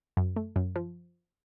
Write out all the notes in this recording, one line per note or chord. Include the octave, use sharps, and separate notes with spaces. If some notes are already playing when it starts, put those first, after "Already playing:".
F#2
A3
F#2
F3